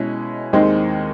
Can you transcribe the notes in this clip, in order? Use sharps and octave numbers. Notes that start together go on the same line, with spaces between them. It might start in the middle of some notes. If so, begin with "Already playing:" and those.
Already playing: B2 G#3 C#4 E4
D#2 D#3 G#3 C4 D#4